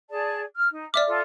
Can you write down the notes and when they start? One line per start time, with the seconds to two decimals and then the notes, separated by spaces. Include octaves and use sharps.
0.09 G#4 D5 A5
0.56 F6
0.70 D#4
0.94 D5 E5 D6 F6
1.07 F4 A4